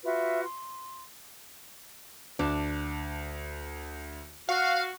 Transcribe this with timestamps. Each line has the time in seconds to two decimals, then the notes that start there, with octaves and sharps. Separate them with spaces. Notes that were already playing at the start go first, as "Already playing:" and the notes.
0.04 F4 F#4 B4 E5
0.44 C6
2.39 D2 D4
4.49 F#4 F5